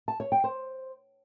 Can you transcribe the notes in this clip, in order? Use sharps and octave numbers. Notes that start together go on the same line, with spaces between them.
A5
C#5
G5
C5